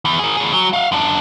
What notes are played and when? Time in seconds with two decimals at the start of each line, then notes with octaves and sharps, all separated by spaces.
0.05 E2
0.19 G#4 A#4
0.37 A2 G#4
0.53 F#3
0.73 F5 F#5
0.92 F#2 D4